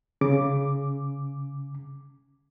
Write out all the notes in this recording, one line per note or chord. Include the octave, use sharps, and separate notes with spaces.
C#3 D6